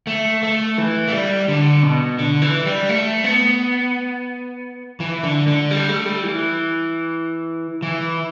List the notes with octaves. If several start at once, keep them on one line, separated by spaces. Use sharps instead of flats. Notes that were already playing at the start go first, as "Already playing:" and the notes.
A3
A3
E3
A3
G3
D3
B2
D3
E3
G3
A3
B3
E3
D3
D3
G3
A3
G3
E3
E3